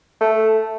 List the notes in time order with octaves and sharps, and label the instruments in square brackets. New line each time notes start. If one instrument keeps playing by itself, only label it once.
[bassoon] A3